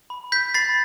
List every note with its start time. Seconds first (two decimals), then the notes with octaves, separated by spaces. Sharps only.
0.10 B5
0.32 G6 B6
0.54 B5 A6 C7